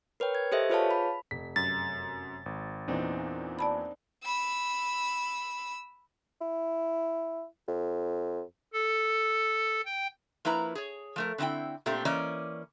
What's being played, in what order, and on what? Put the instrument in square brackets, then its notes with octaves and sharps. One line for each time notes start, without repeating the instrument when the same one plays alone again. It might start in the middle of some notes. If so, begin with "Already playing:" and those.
[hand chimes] A#4 B4 C#5 G5
G#6
G4 A4 C5 D#5 E5
F4 G#4 B4 C#5 F5 A5
B5
[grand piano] F1 [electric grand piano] B6
[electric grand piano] F#2 [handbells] A6
[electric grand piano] G#1
[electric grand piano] E2 A#2 E3 [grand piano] C4 D4 D#4
[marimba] D5 A5 B5
[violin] B5 E6
[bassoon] E4
F2
[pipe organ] A4
G5
[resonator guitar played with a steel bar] F3 A#3 E4 B4 A#5
G#4 C#5
F3 A3 A#4
D3 C4 D#4 E4 G5
A#2 A3 C4 D4 G4
E3 A#3 C#4 D5 D#5